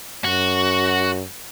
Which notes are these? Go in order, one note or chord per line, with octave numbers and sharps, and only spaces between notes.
F#2 F#4